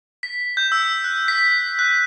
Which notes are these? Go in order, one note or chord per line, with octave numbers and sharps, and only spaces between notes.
B6
G6
E6
F#6
B6
F#6